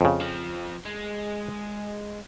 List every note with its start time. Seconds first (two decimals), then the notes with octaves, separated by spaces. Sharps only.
0.01 F2 C#3
0.21 F3 C4
0.85 G#3